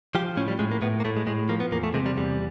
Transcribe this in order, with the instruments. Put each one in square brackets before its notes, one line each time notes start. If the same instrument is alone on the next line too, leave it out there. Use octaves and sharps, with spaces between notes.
[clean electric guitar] F3 G4
A2 C#4
G3
A2 G#3
A#3
A2 B3
A#3
A2 A3
G#3
A2 G#3
F3 A#3
B3
E2 A#3
A3
C3 G#3
G3
E2 G3